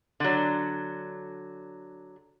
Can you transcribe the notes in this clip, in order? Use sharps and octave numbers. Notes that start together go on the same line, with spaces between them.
D3 F#3